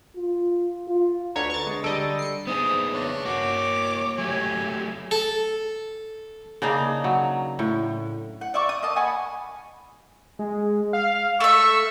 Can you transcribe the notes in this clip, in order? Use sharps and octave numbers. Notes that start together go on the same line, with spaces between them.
F4
F4
D2 D3 B4 C#5 A#5
C#6 A6
G#3
D3 G3 A4 D#5 D7
C7 C#7
B3 D#4 G#4 C5 D#6
D4 C#5
A#3 F#4 D6
F#3 A3 G4 G#5
A4
C#3 A#3 D4 D#4
F#3
A2
F#5
D5 E5 C#6 D6
D#6
A#3 D#5 A5
F#5 G#5 B5 C#6
G#3
F5
A3 E5 C#6 E6